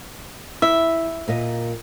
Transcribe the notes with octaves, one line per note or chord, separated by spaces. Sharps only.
E4 E5
A#2 A#4 D#5